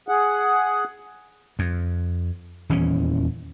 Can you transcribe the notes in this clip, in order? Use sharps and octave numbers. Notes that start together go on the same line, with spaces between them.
G#4 F#5
F2
D#1 E2 E3 C#4